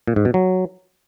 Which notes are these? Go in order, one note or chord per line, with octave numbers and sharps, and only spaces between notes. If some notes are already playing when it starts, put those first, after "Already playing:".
A#2
G#2
B2
F#3